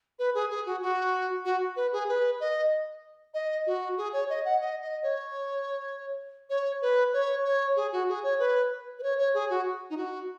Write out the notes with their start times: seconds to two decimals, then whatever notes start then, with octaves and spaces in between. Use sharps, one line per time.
0.19 B4
0.34 G#4
0.50 G#4
0.66 F#4
0.82 F#4
1.45 F#4
1.76 B4
1.93 G#4
2.09 B4
2.40 D#5
3.34 D#5
3.67 F#4
3.97 G#4
4.13 C#5
4.29 D#5
4.45 F#5
4.61 D#5
4.82 D#5
5.03 C#5
6.50 C#5
6.82 B4
7.13 C#5
7.45 C#5
7.76 G#4
7.92 F#4
8.08 G#4
8.23 C#5
8.39 B4
8.99 B4
9.03 C#5
9.18 C#5
9.34 G#4
9.50 F#4
9.90 D#4
9.97 F#4